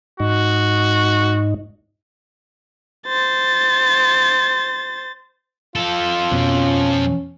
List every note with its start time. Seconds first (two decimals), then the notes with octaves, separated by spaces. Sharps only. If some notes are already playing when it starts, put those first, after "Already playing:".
0.20 G#2 D#4 F#4
3.07 C5 A6
5.76 F3 F4 A4
6.32 F2 B2 C#4